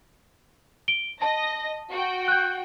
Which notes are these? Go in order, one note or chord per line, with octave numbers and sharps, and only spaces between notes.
D7 G7
D#5 A5 A#6
F#4 G5
F#6 G6